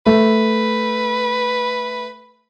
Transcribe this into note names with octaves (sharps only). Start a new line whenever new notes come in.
A3 B4